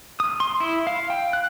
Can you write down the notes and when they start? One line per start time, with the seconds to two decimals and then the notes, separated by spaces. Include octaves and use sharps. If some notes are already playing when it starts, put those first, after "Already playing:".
0.20 D#6
0.40 C6
0.60 E4
0.87 F5
1.10 G5
1.33 F#6